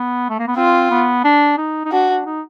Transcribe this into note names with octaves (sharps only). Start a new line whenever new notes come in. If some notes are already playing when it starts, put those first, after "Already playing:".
Already playing: B3
A3
A#3
B3
C4 F4
B3
D4
D#4
D#4
D4 F#4
D4
D#4